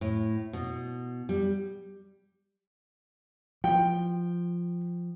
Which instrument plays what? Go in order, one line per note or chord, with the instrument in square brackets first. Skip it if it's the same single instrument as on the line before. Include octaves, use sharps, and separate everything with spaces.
[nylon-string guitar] A2
B2
G3
[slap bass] F3 [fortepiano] G5